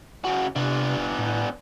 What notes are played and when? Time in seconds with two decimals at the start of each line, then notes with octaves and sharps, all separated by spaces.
0.25 C#3 F#4
0.56 C3 B3 D4
0.97 E1
1.18 A2